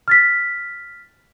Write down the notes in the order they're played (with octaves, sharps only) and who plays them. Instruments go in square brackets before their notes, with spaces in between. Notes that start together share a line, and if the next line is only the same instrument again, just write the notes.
[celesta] F6 A6 B6